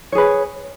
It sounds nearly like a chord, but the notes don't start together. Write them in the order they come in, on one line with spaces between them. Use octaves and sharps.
C#5 G#4 B4